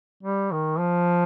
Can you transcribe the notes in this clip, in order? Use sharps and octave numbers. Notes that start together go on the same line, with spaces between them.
G3
D#3
F3